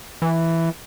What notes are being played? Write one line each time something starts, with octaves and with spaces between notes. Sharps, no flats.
E3